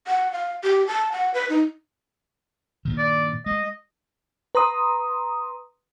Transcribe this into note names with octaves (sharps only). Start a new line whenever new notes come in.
F#5
F5
G4
A5
F#5
B4
D#4
G2 A#2 D#3
D5
G#3 D#5
B4 A#5 C6 D#6